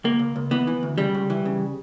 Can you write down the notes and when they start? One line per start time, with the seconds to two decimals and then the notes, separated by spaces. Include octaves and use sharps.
0.04 C#2 A#3
0.19 C#2
0.36 C#2
0.51 E3 B3
0.67 E3
0.83 D2
0.98 C#3 G3
1.14 C#2
1.30 E3
1.45 C#3